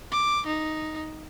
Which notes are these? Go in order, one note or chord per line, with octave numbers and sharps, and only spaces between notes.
D6
D#4